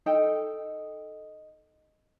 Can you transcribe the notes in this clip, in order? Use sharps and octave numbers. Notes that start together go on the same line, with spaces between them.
D#4 A4 D#5 G5